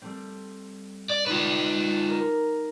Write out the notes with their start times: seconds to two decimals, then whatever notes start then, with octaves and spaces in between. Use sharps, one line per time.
0.02 G3 A3 C4
1.10 D5
1.26 D#4 F4 B4 D5 D#5
2.09 A#4